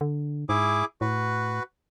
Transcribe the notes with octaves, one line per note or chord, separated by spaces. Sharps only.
D3
G#2 E4 G#4 D6
A2 F#4 B4